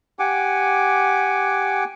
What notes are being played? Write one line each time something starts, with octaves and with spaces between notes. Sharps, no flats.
G4 F#5 G#5 D6